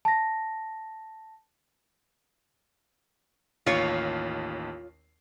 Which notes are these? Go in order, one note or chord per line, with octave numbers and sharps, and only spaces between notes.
A5 A#6
A1 D#2 F4 C#5 C7